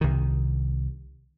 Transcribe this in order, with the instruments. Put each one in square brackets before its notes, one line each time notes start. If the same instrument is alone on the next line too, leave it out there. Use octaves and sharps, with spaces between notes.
[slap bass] C2 D#3